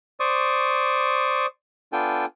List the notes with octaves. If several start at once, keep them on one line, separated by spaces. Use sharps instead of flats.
C5 D5 C#6 D#6
B3 D4 F4 A4 G5 G#5